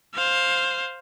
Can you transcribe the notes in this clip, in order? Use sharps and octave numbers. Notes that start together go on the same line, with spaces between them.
C5 F5